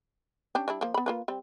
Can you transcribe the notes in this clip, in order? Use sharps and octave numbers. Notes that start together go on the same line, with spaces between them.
C#4 D4 G4
G3 D4 E4
F3 A#3
B3 B5
A#3 F4 B4
G3 C4